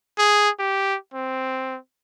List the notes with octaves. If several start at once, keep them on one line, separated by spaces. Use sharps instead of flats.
G#4
G4
C4